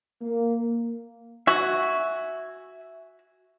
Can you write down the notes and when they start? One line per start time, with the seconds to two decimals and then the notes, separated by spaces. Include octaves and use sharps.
0.22 A#3
1.47 F#4 E5 G#5